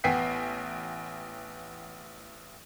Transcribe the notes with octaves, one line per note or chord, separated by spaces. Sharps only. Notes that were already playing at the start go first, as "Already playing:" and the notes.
A1 B3 G5 G#5 B6 C7